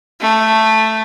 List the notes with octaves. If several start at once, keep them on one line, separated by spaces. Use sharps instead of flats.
A3